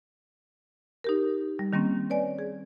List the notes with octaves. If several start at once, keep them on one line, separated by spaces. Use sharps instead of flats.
D#4 G4 A#4
G3
D#3 G3 A#3 C4 C#4
B4 C#5 D5 G#5
G#4